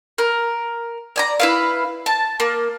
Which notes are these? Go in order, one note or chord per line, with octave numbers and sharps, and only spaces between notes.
A#4
D5 G#5 A#5
E4 B4 F5
A5
A#3